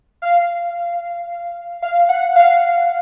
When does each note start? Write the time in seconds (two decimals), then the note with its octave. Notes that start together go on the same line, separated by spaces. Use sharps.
0.22 F5
1.82 F5
2.09 F#5
2.36 F5